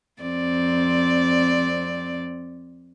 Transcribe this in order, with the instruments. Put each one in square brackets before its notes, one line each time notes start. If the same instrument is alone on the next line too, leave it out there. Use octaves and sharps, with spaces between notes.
[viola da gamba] F2 C4 D5